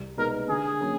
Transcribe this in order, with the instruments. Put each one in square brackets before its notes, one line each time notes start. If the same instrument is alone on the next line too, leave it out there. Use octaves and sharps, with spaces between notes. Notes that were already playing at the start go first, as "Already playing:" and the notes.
Already playing: [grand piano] C2
[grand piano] B2 G#3 B3 D#4 [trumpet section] A#4
[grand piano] D3 [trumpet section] G#4
[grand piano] F#3 A#3 C#4